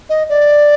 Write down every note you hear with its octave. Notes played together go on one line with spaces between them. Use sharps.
D#5
D5